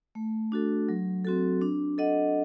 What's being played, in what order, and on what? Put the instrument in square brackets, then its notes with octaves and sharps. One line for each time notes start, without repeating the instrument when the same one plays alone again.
[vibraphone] A3
D4 F#4 A4
F#3
C4 F#4 A4
D4
A4 D#5 F#5